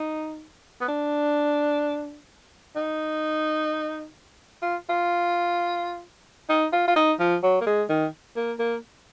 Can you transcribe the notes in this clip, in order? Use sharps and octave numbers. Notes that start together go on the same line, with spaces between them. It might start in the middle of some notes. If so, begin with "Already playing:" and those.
Already playing: D#4
B3
D4
D#4
F4
F4
D#4
F4
F4
D#4
F3
F#3
A#3
G#3
D#3
A#3
A#3